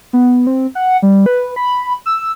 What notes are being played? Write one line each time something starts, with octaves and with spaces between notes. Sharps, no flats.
B3
C4
F#5
G3
B4
B5
E6